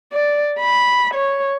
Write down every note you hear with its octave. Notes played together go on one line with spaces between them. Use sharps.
D5
B5
C#5